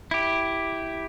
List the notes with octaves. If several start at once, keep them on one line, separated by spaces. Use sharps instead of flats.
E4 G4